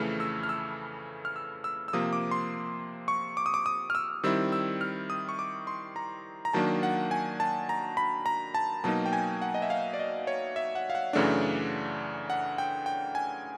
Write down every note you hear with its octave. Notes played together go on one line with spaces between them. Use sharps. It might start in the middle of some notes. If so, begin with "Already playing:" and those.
Already playing: F2 C#3 E3 A3 F6
E6
F6
E6
F6
E6
E6
E6
C3 F3 A#3 D#6
D6
C6
C#6
D6
D#6
D6
D#6
F6
E6
D#3 G3 C4 E4 E6
E6
F6
D#6
C#6
D6
C6
A#5
A#5
D#3 F#3 A#3 D4 A5
F#5
G#5
A5
A#5
B5
A#5
A5
B2 F#3 A#3 D#4 A5
G5
G#5
F#5
D#5
E5
F5
D5
D#5
C#5
E5
F#5
F5
F#5
F#2 C#3 E3 A3 D4
F#5
G5
G5
G#5